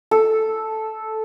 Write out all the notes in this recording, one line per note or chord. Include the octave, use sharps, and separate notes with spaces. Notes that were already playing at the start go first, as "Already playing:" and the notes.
A4